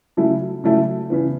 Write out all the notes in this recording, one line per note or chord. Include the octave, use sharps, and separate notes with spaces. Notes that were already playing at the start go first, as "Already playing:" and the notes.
C#3 F#3 A3 E4
C#3 F#3 A3 E4
C#3 E3 B3